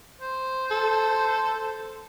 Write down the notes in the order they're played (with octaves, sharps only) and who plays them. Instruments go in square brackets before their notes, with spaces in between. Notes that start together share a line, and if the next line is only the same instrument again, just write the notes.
[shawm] C5
[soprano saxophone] A4